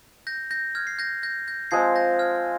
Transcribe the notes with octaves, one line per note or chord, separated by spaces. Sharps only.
G6 A#6
G6 A#6
F6 G#6
C7
G6 A#6
G6 A#6
G6 A#6
F3 G#3 C4 G#6 C7
G6 A#6
F6 G#6